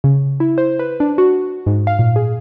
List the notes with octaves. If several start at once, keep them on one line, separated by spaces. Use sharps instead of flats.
C#3
E4
C5
B4
D4
F#4
G#2
F5
A#2
G#4